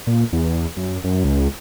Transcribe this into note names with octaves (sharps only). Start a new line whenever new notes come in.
A#2
E2
F#2
F#2
C#2